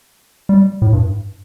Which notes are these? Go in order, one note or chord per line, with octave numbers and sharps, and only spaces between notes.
G3
A2
G2